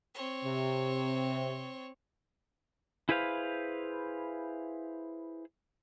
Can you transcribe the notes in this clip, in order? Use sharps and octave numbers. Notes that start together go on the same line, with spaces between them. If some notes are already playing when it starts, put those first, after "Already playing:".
C4 C#5
C3
E4 G#4 B4 C5 F5